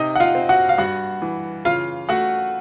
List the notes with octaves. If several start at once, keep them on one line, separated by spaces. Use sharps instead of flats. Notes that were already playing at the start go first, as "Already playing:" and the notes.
Already playing: C3 D#4 D#5
F#5
F4 F5
C4
F#4 F#5
F5
G2 F#4 F#5
E3
C#3 F4 F5
A3 F#4 F#5